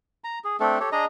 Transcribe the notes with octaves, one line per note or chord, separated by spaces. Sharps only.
A#5
G#4
A3 C4 D4 A4
G4 A4 C#5
D4 G#4 D#5 A#5